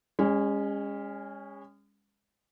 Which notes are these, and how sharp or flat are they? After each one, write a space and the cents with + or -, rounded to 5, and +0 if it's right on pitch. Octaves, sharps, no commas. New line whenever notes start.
G#3 -30 C#4 +5